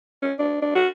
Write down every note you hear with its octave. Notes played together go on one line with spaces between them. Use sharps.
C#4
D4
D4
F#4